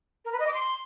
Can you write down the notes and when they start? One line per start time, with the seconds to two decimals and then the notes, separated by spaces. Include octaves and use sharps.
0.24 A#4
0.32 B4
0.39 D#5
0.46 D6
0.54 C6